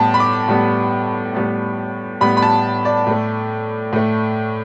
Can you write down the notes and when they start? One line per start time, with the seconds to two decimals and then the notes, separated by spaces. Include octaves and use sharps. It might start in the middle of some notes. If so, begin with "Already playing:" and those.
Already playing: A2 G3 B3 A5
0.14 B5
0.20 D6
0.49 A2 G3 B3
1.35 A2 G3 B3
2.21 A2 G3 B3 B5
2.37 B5
2.43 A5
2.85 D5
3.07 A2 A3
3.93 A2 A3